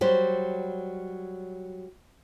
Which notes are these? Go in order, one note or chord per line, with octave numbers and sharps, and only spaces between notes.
F#3 G3 C5